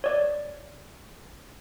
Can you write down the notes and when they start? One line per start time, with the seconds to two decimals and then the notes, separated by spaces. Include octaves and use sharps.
0.04 C#5 D5